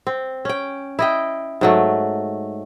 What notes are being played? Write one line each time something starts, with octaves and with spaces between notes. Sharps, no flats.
C4
C#4 G5
E4 D#5 G5
G#2 F#3 A3